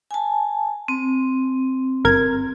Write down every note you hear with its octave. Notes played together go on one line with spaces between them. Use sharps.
G#5 A5
C4
G1 A#4 G#6